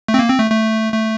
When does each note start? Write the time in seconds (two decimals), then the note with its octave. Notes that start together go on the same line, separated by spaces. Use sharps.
0.08 A3
0.14 C4
0.19 A#3
0.29 C4
0.39 A3
0.51 A3
0.93 A3